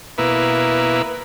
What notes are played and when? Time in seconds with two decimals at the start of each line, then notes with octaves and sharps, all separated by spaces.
0.18 B2 A#3 E4 B4